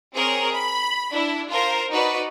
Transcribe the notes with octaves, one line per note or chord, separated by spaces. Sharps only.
C4 G#4 A#4 C#5
B5
D4 E4
F4 A#4 C5
D#4 F#4 B4 D5